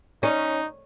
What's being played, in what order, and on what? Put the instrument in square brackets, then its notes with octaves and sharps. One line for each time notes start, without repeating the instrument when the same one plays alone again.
[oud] C#4 [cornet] D#4